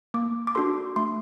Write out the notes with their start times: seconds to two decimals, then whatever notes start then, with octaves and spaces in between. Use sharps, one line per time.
0.14 A#3 D6
0.47 D6
0.55 D4 F#4 A4 C6
0.96 A3 C6